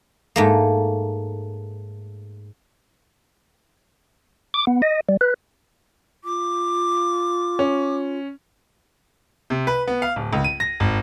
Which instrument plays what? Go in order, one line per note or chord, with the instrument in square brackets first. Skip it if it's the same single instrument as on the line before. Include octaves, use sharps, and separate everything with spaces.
[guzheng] G#2 A3 A#3
[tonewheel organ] D6
B3
D#5
G3
B4
[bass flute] F4 [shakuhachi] D6
[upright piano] C#4
[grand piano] C3
B4
B3
F5
D1
C#2
D#7
A#6
G#1